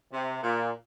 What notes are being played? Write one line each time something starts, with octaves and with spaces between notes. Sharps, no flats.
C3
A#2